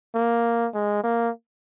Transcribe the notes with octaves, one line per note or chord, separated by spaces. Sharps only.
A#3
G#3
A#3